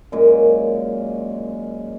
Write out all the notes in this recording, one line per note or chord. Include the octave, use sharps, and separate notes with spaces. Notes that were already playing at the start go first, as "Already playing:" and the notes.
F#2 A#2 G#3